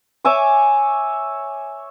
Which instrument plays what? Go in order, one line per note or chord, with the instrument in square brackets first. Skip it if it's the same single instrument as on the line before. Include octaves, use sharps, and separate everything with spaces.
[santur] C#5 E5 G#5 D6